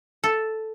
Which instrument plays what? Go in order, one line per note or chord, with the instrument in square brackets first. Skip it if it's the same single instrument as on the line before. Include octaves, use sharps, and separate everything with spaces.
[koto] A4